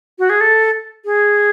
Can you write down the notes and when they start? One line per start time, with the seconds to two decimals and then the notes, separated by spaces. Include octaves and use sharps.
0.19 F#4
0.30 G#4
0.41 A4
1.05 G#4